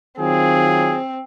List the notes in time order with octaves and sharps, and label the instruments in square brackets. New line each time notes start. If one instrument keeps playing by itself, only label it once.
[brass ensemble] D#3 F#3 F4 [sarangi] C4 [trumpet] G#4